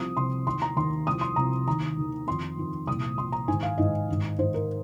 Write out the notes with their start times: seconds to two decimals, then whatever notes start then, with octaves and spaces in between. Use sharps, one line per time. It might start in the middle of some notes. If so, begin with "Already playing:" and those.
Already playing: C2 C3 F3 D#6
0.16 C2 C3 F3 C6
0.46 D#2 D#3 C6
0.62 A#5
0.76 D#2 D#3 C6
1.07 C2 C3 F3 D#6
1.21 C6
1.36 C2 C3 F3 A#5
1.66 D#2 D#3 A#5
1.97 D#2 D#3
2.27 F2 D#3 C6
2.57 F2 D#3
2.87 C2 A#2 F3 D#6
3.18 C2 A#2 F3 C6
3.32 A#5
3.48 G#2 D#3 G#5
3.63 F5
3.78 G#2 D#3 D#5
4.08 G#2 D#3
4.39 G#2 D#3 C5
4.54 A#4